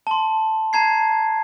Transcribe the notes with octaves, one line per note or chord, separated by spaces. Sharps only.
A5 C6
A5 A#5 G#6 C7